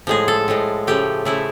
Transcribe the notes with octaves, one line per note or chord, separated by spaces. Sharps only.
A2 F3 G#3 G#4
A4
A2 F3 G#3
C#3 F3 A3 G4
C#3 F3 A3 E4